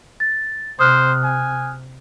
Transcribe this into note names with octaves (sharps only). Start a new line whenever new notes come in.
A6
C3 C5 D#6 F6 F#6
G#5